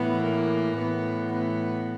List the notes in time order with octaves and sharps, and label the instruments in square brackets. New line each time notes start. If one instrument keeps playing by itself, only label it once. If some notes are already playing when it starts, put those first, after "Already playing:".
Already playing: [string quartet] A2 E3 B3
A#3
A2 E3 B3
B3